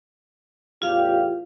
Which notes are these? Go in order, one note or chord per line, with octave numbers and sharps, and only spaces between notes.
A1 E2 F4 G4 F5